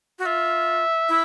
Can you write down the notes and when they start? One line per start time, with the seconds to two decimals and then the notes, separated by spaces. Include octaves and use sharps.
0.19 F#4
0.26 F4 E5
1.09 E4